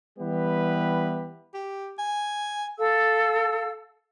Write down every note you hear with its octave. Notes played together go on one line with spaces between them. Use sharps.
E3 G3 B3 E4 G4 B4
G4
G#5
A4 F5 E6